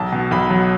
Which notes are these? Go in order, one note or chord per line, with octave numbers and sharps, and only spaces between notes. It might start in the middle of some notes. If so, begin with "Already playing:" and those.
Already playing: B1 A5
B2
B1 B5
F#3